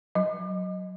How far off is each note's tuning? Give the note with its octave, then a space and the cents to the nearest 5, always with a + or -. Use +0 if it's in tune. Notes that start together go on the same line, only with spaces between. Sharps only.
F#3 +0 D#5 +0